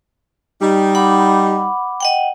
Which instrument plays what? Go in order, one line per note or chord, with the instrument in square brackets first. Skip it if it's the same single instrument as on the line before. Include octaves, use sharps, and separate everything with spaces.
[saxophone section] G3 D#4
[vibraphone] F#5 B5 D6
D#5 F#5 G5